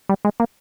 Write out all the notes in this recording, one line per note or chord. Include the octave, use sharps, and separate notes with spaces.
G3
G#3
A#3